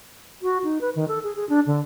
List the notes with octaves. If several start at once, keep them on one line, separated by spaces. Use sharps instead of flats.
F#4
D#4
B4
D#3
A4
G#4
G#4
D4
D3